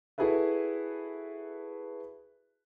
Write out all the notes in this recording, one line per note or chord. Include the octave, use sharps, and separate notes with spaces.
E4 F#4 G#4 A4 B4 E5